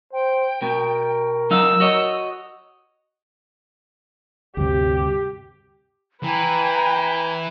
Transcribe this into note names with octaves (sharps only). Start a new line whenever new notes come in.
C5 G5
B2 A#4
F#3 D#4 F5 E6
F#4 C#5 D#5
D2 G2 C3 G4
E3 B4 G5 G#5 A#5